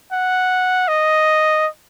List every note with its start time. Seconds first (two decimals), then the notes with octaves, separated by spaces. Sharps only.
0.13 F#5
0.88 D#5